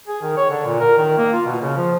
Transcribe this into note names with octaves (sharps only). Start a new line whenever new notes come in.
G#4
D#3
C#5
D3
A#2
A#4
D#3
A#3
F4
B2
C#3
F3